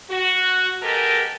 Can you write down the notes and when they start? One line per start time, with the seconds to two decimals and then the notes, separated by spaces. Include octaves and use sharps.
0.10 F#4
0.81 G#3 B3 G4 A4 A#4